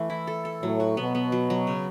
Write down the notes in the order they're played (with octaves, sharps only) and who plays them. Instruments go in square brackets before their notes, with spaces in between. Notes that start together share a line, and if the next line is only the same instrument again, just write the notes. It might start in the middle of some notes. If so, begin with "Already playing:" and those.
Already playing: [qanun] E3 A3
E4
A4
A4
[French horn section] A2 [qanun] F#3
[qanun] F#4
[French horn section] B2 [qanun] B3
[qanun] B3
F#3
F#3
C#3